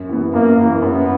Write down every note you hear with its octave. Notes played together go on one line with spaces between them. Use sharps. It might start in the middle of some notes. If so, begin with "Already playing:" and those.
Already playing: F#2
E3 B3
F#2 A#3
E3 B3
F#2 B3